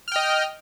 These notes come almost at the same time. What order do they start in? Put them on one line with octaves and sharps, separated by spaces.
F6 G5 D#5